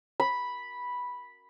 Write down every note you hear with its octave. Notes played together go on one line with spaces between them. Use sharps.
B5